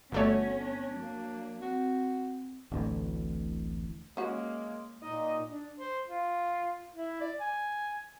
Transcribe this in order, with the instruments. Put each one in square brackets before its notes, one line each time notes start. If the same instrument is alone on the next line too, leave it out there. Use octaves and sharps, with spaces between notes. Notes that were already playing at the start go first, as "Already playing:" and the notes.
[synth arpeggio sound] G1 A3 C#5 [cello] B3 C#4 [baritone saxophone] F#4
[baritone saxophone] D4
[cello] F#3 A#3
[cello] C4 [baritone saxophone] F#4
[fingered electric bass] D1 A1 D3
[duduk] G#3 [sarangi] A#3 [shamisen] C#4 F#4
[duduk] A#2 [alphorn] D#4 [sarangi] D#5
[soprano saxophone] D4
C5
F4
E4
D5
G#5